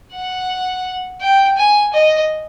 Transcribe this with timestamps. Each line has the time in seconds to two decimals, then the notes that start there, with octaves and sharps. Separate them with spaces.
0.14 F#5
1.21 G5
1.57 G#5
1.93 D#5